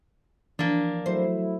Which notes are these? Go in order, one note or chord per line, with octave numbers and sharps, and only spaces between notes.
E3 F3 A#3 D4
F#3 A3 E4 C5